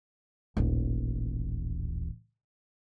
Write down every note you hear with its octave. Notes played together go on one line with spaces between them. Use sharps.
D#1 A1